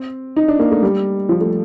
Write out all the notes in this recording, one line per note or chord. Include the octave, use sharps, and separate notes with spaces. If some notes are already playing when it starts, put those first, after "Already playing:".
Already playing: C4
D#4
D4
A#3
A3
G3
F3
A3